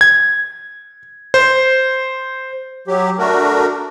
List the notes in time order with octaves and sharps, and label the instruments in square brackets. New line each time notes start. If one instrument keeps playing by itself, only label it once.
[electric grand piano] G#6
C5
[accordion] F#3 G4
A3 D4 F#4 A#4